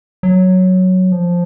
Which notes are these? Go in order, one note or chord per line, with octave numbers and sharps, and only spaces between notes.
F#3
F3